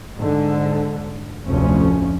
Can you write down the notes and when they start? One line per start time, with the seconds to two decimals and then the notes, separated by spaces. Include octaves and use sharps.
0.17 G#2 D3
1.46 F1 D2 A2 F3 C#4